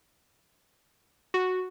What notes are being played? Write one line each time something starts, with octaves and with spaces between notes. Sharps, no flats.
F#4